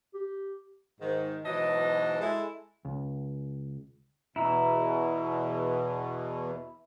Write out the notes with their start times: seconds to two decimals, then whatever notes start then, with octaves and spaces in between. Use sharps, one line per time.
0.14 G4
1.01 G#2 D#3
1.45 G#2 B2 E3 F#3 D#5 A5
2.21 G#3 E4 A4
2.85 C#2
4.36 E2 B2 E4 A#5 E6